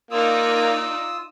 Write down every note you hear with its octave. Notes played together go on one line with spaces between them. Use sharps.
A#3 D#4 F4 D5 D#6 E6